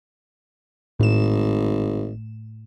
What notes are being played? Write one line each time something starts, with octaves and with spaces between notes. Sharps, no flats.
G#1 A2 E7